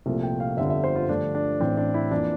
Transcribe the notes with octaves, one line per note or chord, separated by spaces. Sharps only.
C2 A#2 F3 A3
G5
F5
G1 F2 D3 G3 E5
E5
C5
F4
G2 D3 F3 A3 D4
D4
A1 A2 E3 C4
D4
E4
F2 E3 A#3 D4